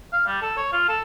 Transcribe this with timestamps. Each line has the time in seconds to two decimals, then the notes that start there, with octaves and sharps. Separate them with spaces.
0.12 F5
0.26 G3
0.42 A4
0.57 C#5
0.72 F4
0.89 A4